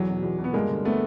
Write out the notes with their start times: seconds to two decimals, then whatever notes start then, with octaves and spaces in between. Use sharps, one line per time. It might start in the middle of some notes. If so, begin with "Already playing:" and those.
Already playing: E2 F#3
0.08 B2
0.23 E2
0.39 B2
0.44 B3
0.53 G2 G#3 A#3
0.69 D3
0.85 A3 B3